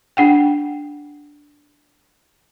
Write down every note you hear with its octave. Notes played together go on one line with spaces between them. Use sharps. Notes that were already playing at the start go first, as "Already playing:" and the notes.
D4 F#5 G5